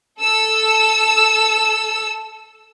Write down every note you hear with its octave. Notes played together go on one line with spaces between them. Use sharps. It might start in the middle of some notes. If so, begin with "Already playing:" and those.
A4 E6